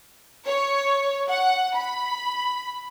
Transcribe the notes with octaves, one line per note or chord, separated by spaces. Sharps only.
C#5
F#5
B5